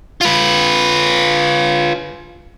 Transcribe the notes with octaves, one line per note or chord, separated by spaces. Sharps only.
F4 B4